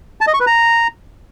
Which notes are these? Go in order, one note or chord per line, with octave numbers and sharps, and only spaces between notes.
A5
D#5
C#6
B4
A#5